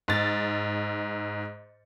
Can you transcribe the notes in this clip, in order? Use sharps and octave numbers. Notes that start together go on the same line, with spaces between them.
G#2 A6